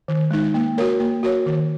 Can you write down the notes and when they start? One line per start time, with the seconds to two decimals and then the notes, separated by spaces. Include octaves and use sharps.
0.08 D#3
0.31 G#3 D#4
0.54 A#3
0.78 F#4 A#4 C#5
1.00 A#3
1.23 F#4 A#4 C#5
1.46 D#3